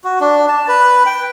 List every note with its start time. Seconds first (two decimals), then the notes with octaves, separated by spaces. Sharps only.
0.04 F#4
0.21 D4
0.48 A5
0.68 B4
1.06 G5